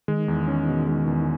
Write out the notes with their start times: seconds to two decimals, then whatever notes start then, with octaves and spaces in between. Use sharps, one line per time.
0.08 D#3 G#3
0.28 E2
0.48 C#4
0.68 B2
0.87 G#3
1.07 E2